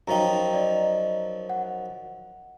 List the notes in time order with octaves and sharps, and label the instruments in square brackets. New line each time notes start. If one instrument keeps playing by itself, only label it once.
[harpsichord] F#2 F3 D#4 [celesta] G5 A#5
[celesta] D5 D#5
F#5